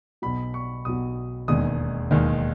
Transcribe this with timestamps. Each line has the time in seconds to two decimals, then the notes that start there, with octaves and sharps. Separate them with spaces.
0.22 B1 B2 F#3 B5
0.54 C#6
0.85 B1 B2 F#3 D#6
1.48 E1 D#2 D#3 G#3 D#6
2.11 E1 D#2 D#3 G#3